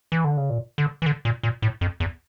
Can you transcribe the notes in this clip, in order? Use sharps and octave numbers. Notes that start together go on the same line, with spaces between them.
E3
D3
C#3
A#2
D3
E3
D3
A#2
A#2
A2
F2
E2